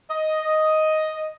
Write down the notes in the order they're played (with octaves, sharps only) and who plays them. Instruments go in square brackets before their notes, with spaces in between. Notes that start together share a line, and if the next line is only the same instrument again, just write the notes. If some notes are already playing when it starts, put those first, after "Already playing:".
[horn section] D#5